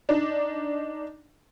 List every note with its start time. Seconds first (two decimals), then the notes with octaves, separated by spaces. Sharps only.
0.09 D4 D#4